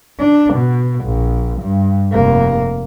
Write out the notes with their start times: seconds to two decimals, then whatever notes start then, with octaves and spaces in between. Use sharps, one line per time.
0.19 D4
0.54 B2
1.05 A#1
1.61 G2
2.12 F1 A#3